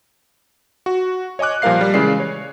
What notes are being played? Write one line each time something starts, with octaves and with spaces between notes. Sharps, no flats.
F#4
C#5 D#5 G#5 D6 F#6
A#2 F3 G3 A#4 F5 C7
G3
C#3 E3 G#3 D5 C7
C#5